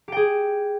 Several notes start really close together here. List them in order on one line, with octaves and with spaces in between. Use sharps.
G4 G5 G#4